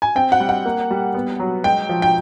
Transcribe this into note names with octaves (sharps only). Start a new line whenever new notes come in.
G#5
C4 G5
F#5
G3
F#5
A#3
G3
B3
F#3
G#3 G5
F3
G5